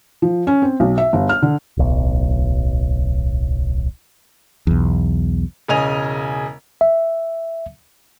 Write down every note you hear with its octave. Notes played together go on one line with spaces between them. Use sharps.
F3
C#4
C4
B1
E5
G1
F6
D3
D1 B1
B1 E2
E1 C#3 D#5 G#5 F7
E5